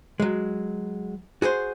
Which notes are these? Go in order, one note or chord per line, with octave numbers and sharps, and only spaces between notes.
F#3 G#3
F#4 G#4 B4 C5